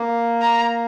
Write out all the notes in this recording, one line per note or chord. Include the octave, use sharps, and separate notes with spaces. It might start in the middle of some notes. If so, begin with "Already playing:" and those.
Already playing: A#3
A#5